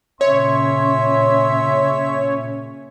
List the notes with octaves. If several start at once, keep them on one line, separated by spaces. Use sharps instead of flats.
A#2 C#3 C#4 C#5 E5 C6